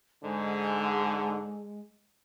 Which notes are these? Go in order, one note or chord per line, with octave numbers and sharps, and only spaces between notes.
G#2 D3 G#3